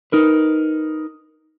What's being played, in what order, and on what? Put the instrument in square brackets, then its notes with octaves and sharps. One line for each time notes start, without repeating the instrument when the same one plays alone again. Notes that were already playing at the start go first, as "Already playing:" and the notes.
[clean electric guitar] D#4 A#4 B4